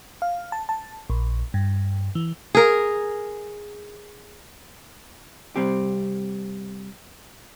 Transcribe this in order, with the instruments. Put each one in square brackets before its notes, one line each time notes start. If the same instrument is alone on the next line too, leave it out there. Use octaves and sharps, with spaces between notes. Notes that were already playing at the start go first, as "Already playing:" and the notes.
[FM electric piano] F5
A5
A5
A#1
G2
E3
[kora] G#4 A#4
[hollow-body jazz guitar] C3 G3 C4 G4